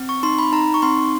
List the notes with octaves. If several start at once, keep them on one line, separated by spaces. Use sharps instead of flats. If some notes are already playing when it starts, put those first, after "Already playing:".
Already playing: C4
C#6
D#4 C6
B5
D#4 A#5
C#6
C4 C6